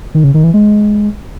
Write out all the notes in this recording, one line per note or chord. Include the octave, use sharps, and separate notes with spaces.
D#3
C#3
D#3
E3
G#3